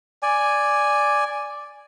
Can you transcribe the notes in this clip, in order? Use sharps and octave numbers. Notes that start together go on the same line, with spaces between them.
D5 G#5